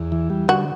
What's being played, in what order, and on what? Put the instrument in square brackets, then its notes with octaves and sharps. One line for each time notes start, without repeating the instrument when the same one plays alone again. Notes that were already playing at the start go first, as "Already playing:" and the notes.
Already playing: [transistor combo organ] E2
E3
G3
[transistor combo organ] D3 [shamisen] F#4